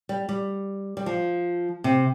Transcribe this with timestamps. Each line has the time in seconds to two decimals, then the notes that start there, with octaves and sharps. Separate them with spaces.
0.09 G3
0.29 G3
0.97 G3
1.06 F3
1.84 C3